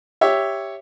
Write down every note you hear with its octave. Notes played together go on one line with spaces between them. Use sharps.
G4 C#5 E5